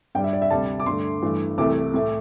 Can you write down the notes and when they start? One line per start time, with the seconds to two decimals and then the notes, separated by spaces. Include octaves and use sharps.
0.15 G2 G5
0.19 G3
0.24 E5
0.33 D5
0.42 E5
0.50 D2 C3 G3 A5
0.80 D6
0.86 G2 D3 A3 C6
1.22 G2 E3 A3
1.58 C2 C3 E3 A3 D6
1.94 A2 A3